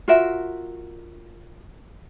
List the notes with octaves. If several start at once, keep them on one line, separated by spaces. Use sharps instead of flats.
F4 F#4 A#4 E5